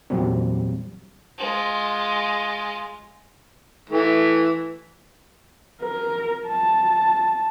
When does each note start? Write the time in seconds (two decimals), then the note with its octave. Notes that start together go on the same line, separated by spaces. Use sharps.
0.10 E2 A#2 F#3 G3 C4
1.38 G#3 F4
3.90 E3 A3
5.83 A#4
6.47 A5